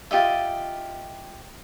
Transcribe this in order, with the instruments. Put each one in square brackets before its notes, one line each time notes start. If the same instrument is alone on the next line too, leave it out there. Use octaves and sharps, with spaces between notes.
[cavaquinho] F4 G4 D#5 E5